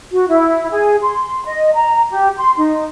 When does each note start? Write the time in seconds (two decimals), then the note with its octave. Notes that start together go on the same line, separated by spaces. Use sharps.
0.12 F#4
0.28 E4
0.71 G#4
1.02 C6
1.45 D#5
1.73 A#5
2.10 G4
2.37 C6
2.57 D#4